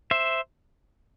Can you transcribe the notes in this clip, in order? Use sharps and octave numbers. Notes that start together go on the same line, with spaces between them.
C5 E5